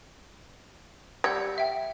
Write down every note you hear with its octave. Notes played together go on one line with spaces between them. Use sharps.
G3 F#5 E6 G#6
E5 G5